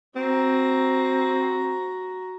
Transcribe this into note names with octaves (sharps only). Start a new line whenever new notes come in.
C4 F#4 A#5